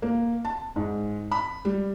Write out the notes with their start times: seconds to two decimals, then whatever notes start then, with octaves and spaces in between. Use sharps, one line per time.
0.02 A#3
0.45 A5
0.76 G#2
1.31 B5
1.65 G3